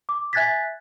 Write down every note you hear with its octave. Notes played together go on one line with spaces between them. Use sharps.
D6
E5 G#5 F#6 G#6 A6 B6